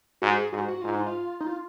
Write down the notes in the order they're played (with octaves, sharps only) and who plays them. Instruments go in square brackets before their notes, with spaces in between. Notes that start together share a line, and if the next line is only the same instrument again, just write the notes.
[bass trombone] G#2 [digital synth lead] F#4
[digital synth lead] G#4
[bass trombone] G#2 [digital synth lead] F#4
[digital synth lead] F#4
[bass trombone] G#2 [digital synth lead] F4
[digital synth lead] D#4
F4
D#4
F4